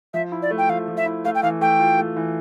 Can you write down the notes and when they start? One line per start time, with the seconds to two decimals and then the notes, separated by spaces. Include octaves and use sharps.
0.14 F3 E5
0.32 E4
0.42 D5
0.51 A3
0.58 G5
0.69 F3 F5
0.88 F3
0.97 E5
1.06 E4
1.25 A3 F5
1.35 G5
1.43 E3 F5
1.61 A3 G5
1.79 F4
1.99 A3
2.17 E3